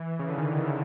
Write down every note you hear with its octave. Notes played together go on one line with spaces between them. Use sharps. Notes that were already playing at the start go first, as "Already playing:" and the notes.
Already playing: E3
C#3
D3
D#3
D3